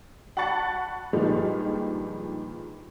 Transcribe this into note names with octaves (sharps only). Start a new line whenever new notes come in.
F#5 A5 B5 C#6 A6 C#7
G2 A#2 D#3 F3 G3 G#3